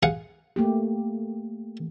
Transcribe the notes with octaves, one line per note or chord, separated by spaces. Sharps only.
G#4 F5 F#5
A3 A#3 G4